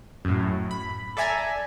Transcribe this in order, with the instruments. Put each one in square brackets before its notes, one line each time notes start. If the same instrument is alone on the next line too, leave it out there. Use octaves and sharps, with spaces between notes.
[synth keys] F#2 A2
B5
A4 D5 E5 G#5 A#5